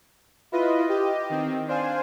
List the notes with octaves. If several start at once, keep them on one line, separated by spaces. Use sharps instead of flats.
E4 F4 B4 D#5
G4 D#5
D#3 C4
D4 C5 F5 G#5